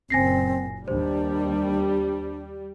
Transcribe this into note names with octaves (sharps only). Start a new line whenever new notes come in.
F#1 A#2 C4 G#5 A#6 C7
D#2 G3 D4 C5